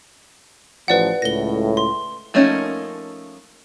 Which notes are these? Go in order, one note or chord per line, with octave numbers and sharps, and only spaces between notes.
A1 F3 B4 D5 F#5
C#2 A2 A#6 G7
C6
F3 A3 A#3 C#4 D#4